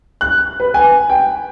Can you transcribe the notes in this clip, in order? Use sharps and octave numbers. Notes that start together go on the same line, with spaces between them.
F#6
B4
G#5
G5